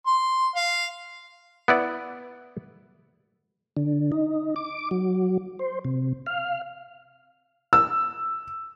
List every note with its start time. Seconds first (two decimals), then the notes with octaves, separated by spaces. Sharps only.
0.07 C6
0.56 F5
1.68 B3 E4 D5
3.77 D3
4.12 D#4
4.56 D6
4.91 F#3
5.59 C5
5.85 C3
6.26 F5
7.73 E6